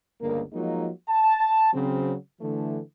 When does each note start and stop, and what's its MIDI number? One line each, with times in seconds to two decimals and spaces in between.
0.21 0.42 31
0.21 0.42 37
0.21 0.42 50
0.21 0.42 58
0.53 0.90 53
0.53 0.90 54
0.53 0.90 56
0.53 0.90 58
0.53 0.90 63
0.53 0.90 65
1.08 1.72 81
1.73 2.15 49
1.73 2.15 54
1.73 2.15 60
2.41 2.79 50
2.41 2.79 52
2.41 2.79 57